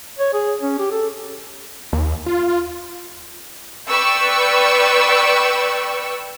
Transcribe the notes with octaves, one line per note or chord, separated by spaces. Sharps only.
C#5
G#4
C#4
G4
A4
D#2
F4
B4 D5 G5 C#6 E6